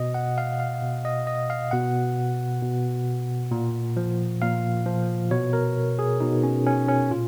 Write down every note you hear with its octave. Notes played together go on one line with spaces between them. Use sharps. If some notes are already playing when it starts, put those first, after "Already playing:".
Already playing: B2 D#5
F#5
F5
F5
B2
D#5
D#5
F5
B2 F#5
B2
A#2
F3
A#2 F5
F3
B2 C#5
A#4
G#4
B2 D#4
C#4
C#4
C#4
A#2 F4